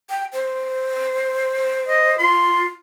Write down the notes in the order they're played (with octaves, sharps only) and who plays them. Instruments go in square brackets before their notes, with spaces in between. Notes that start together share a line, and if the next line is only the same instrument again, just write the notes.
[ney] G5
C5
[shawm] D#5
[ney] F4 [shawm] C6